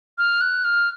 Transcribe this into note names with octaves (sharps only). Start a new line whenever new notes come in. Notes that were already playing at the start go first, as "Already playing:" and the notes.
F6
F#6
F6